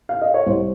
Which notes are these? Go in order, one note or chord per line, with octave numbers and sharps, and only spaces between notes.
F5
D#5
C#5
C2 C5